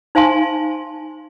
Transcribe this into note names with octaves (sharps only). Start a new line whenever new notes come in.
D#4 C5 F5 G#5 A5 C6